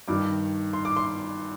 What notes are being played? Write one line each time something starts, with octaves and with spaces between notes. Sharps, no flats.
G2 D#3 D6
C6
D6
C6